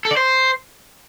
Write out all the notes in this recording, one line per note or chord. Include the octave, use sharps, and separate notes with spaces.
A4
D5
C5